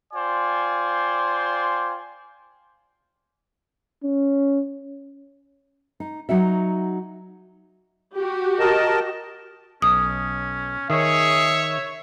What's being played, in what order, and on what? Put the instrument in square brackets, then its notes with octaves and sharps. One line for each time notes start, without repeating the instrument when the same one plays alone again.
[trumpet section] F4 C5 D5 G5 G#5 C6
[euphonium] C#4
[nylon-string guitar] D#4
F#3 D#4 F#4 E5
[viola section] F#4 G4
[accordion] A#4 D#5 A5
[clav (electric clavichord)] B1 [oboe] C#4 [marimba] D#6
[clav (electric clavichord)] D#3 [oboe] G#4 [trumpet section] C#5 E5